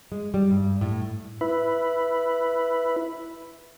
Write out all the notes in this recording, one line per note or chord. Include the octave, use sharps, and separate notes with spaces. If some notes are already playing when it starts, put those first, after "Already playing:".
G#3
G3
G2
A2
E4 B4